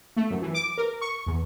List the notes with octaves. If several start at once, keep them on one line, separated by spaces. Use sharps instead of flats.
A3
F#2
E3
D6
A#4
C#6
E2